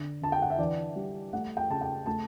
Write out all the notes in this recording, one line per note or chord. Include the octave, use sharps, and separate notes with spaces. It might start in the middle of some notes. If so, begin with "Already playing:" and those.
Already playing: D3
D3 A5
G5
F#5
E5
E3 D5
G3
A3 F#5
G5
C#3 A5
G5
A3 A5